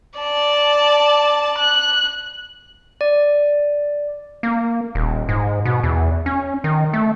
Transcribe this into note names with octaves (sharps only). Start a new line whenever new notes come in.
D5 A5
F#6
D5
A#3
D#1
G#2
B2
E2
C#4
D#3
A3